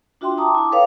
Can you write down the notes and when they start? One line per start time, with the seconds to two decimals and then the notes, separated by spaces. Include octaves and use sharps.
0.21 D4 F4 F#4 E5 G5 C6
0.38 G5 A5 A#5 D6 D#6
0.55 E4 D6
0.72 A4 B4 C#5 F5 G5